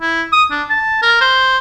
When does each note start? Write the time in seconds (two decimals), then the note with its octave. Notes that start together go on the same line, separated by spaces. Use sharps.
0.01 E4
0.32 D#6
0.51 D4
0.70 A5
1.02 A#4
1.21 C5